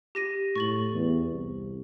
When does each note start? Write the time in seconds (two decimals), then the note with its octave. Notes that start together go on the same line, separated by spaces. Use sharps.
0.15 G4 A#6 D#7
0.56 A2 C#6 A6 F#7
0.94 E2
1.31 C2